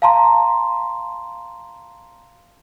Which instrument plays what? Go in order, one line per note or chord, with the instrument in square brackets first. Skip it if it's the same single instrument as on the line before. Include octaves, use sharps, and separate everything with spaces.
[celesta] F5 A5 A#5 C6